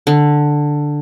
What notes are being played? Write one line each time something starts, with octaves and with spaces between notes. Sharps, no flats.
D3